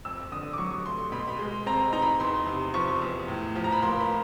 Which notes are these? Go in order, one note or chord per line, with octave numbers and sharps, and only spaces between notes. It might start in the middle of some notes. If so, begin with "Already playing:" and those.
F2 E6
D3 D#6
D6
F#3 C#6
A3 C6
B2 B5
C6
B5
G#3
C4 A#5
D#4 A#5
B5
E2 C6
C3
F3 C#6
E2
A2
F3
A#5
B5
A#3 C6
B5